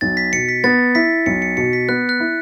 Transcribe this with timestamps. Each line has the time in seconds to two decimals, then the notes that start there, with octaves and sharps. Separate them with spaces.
0.01 B1 A6
0.17 B6
0.33 B2 C#7
0.48 B6
0.64 B3 A6
0.95 E4 B6
1.26 B1 C#7
1.42 C#7
1.57 B2 C#7
1.73 B6
1.88 B3 F#6
2.09 F#6
2.20 E4